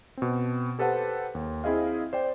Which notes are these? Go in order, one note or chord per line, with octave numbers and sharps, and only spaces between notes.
B2 C4
G4 A4 B4 C5 F#5 A5
D#2
C4 E4 G#4 D#5 F5
C5 D5 G5